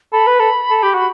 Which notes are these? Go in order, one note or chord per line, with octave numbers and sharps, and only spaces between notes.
A4 B5
B4
A4
A4
G4
F#4